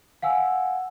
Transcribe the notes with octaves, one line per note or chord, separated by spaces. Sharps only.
F5 F#5 G#5 E6